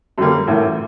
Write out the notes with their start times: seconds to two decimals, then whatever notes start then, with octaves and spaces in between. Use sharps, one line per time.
0.18 F#2 D3 G3 A#3
0.47 A1 A2 E3